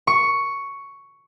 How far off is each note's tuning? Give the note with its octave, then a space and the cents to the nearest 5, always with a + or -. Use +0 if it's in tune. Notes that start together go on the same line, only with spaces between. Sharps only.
C#6 +5